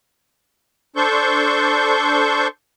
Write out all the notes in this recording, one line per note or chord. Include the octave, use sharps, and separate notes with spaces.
D4 A4 C5 C#6 G6